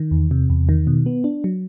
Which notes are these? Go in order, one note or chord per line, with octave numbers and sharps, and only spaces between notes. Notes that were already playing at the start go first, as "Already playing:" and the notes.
Already playing: D#3
E2
C3
E2
D#3
B2
B3
D4
F#3